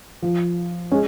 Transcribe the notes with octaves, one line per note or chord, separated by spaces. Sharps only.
F3
G#3 C#4